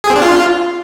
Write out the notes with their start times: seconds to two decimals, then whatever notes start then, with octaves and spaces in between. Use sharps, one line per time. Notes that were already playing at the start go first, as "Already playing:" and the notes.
0.04 G#4
0.10 C4
0.16 D4
0.22 F4